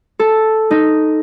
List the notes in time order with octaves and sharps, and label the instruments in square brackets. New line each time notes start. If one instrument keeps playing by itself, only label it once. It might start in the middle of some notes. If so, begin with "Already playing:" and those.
[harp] A4
D#4